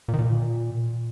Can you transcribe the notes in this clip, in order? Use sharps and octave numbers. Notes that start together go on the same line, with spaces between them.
A#2
D#3
A#2